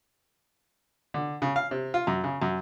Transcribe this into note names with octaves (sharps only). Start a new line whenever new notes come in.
D3
C#3
F5
C3
F4
F#2
C#3
F#2